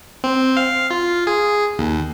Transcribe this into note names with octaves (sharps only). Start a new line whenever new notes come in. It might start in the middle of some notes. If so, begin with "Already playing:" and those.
C4
F5
F4
G#4
D#2